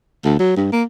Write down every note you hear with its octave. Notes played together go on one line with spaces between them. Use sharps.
D2
F#3
G2
A#3